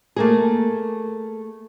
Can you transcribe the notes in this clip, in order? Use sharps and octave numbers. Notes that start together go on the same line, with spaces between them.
A3 A#3 G#4